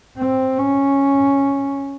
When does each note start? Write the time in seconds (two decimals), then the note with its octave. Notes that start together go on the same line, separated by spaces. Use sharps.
0.17 C4
0.58 C#4